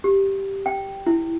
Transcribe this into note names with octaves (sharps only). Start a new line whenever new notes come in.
G4
G5
E4